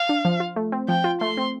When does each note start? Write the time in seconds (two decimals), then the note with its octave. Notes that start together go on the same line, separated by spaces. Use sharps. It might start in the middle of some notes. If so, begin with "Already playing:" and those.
Already playing: F5
0.09 D4
0.25 F3
0.40 F4
0.56 A3
0.72 C4
0.88 F3 G5
1.04 F4
1.21 A3 C6
1.37 C4